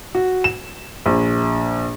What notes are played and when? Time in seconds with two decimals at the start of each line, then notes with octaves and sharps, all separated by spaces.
0.15 F#4
0.44 E7
1.06 A#1